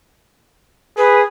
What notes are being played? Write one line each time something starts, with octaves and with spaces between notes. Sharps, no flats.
G#4 B4